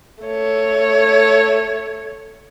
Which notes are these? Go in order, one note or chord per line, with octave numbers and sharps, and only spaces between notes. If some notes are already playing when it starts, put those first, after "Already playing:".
A3 C#5